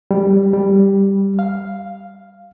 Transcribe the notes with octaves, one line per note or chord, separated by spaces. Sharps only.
G3
G3
F5